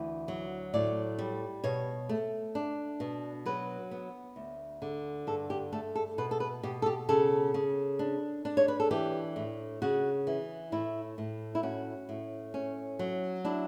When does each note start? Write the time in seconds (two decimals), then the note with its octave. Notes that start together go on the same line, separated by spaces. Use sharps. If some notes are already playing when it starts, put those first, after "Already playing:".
Already playing: D2 E3
0.28 F#3
0.74 A2 D5
1.19 G3
1.64 B2 C#5
2.09 A3
2.55 D4
3.00 B2
3.46 F#3 B4
3.91 B3
4.36 D2
4.82 D3
5.27 G2 A4
5.50 G4
5.72 A3 A4
5.95 A4
6.18 B2 B4
6.31 A4
6.40 B4
6.63 B2 G4
6.82 A4
6.86 G4
7.09 C#3 A4
7.54 C#3
7.99 D4
8.45 D4
8.57 C#5
8.68 B4
8.80 A4
8.91 E3 G4
9.36 A2
9.82 C#3 F#4
10.27 E3
10.72 A2 E4
11.18 A2
11.55 E4
11.63 C#4 F#4
12.09 A2
12.54 C#4
12.99 F#3
13.45 D4 E4